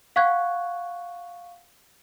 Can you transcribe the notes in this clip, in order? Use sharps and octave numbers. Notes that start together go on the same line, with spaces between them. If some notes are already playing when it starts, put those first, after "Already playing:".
F5 F#5 C#6 F#6 G#6